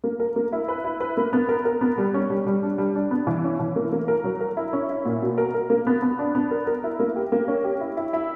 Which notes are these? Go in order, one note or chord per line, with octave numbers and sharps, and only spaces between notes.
A#3
A#4
A#3
E4
B4
E4
B4
A#3
B3
A#4
A#4
B3
G3
C#4
G3
G3
D4
G3
D4
B3
E3
C#4
E3
A#3
A#3
A#4
F#3
A#4
E4
C#4
E4
A#2
B2
A#4
A#4
A#3
B3
B3
D4
B3
A#4
A#4
E4
A#3
G4
A#3
C#4
G4
E4
E4
E4